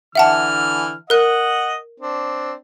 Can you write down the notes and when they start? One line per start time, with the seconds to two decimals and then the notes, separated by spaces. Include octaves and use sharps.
0.15 D3 E3 E5 F#5 A5 F6
1.10 A#4 D#5 F#5 F#6
2.00 C4 D4